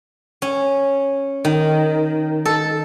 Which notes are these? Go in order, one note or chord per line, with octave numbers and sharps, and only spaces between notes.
C#4
D#3
A4